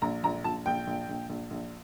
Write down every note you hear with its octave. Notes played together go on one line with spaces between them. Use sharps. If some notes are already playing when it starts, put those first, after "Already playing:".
A#1 A#5
A#1 A#5
A#1 A5
A#1 G5
A#1
A#1
A#1
A#1